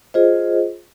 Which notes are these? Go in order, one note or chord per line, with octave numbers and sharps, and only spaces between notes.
F4 G#4 C5 D#5